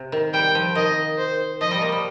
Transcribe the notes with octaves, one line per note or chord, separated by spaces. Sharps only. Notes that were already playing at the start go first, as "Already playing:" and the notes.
Already playing: C3
D#3
G3 G5
F3
D#3 D#5
C5
F3 D#5
G3
F3 A#3
G3